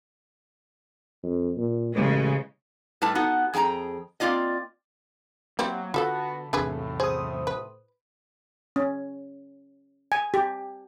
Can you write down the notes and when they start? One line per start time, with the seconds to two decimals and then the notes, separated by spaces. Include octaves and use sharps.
1.23 F2
1.57 A#2
1.95 A1 C#3 G#3
3.02 A2 G3 E4 B4 A5
3.15 B3 D#4 F#4
3.54 F2 G#4 G5 A5 A#5
4.20 A#3 C4 F4 D5 D#5
5.59 F#3 G3 A#3 C4 E4
5.94 D3 B3 F4 F#4 A4 F#5 A5 B5
6.53 B1 E2 A2 C3 D4 G#4 B4
7.00 G#4 C5 D#6
7.47 B4
8.76 C#4
10.12 G#5
10.34 G4